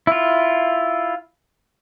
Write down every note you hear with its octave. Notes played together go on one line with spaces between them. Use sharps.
E4 F4